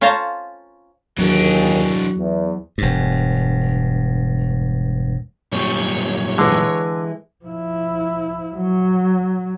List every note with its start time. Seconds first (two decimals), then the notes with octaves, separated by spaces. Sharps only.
0.01 C#4 F4 C5 F5 A5 A#5
1.19 D#2 E3 F#3 D4 F#4 G#4
2.17 E2
2.78 E1 G2
5.53 F#2 A#2 G3 C#5
6.38 D3 E3 G#3
7.45 F3 E4
8.56 F#3